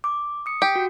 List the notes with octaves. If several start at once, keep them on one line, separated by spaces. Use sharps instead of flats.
D6
D#6 C#7
G4
F#4